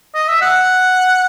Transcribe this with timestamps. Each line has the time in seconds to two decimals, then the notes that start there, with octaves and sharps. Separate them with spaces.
0.14 D#5
0.28 E5
0.42 F#5